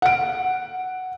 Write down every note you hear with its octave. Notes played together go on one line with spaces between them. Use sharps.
F#5 D7